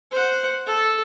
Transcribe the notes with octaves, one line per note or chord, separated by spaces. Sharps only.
C5 F#5
A4